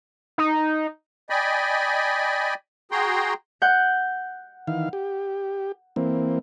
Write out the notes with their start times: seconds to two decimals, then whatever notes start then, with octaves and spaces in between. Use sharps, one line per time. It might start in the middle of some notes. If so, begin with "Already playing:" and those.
0.38 D#4
1.30 D5 D#5 G5 G#5 B5
2.91 F#4 G#4 G5 A#5 C6
3.62 F#5 G6
4.67 D#3 E3 F5
4.93 G4
5.96 E3 A#3 C4